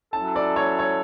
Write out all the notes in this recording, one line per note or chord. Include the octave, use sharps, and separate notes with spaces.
F#3 C#4 E4 A4 A5
D5
C#5
C#5